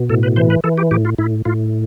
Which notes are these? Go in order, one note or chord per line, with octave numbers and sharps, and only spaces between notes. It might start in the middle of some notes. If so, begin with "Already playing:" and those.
Already playing: B2
A2 A4
B4
E3 C5
B4
E3 A4
G4
A2 G4
F4
A2 E4
A2 F4